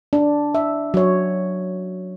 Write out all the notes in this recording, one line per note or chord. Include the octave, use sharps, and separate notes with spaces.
D4
E5
F#3 C#5